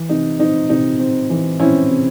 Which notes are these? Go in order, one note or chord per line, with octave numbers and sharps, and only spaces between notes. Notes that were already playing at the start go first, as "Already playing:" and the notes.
Already playing: E3
C3 D#4
C4 D#4
C3 D#4
C4
E3
C4 C#4 E4
C3